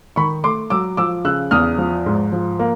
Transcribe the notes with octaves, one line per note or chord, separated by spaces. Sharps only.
D#3 B5 C#6
A3 C6 D6
F#3 D6 E6
F3 D6 E6
C#3 E6 F#6
E2 D#6 F6
F3
G#2
F3
A#3